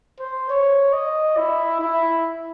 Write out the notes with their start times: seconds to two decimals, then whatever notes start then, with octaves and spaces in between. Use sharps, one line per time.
0.20 C5
0.49 C#5
0.93 D#5
1.37 E4
1.81 E4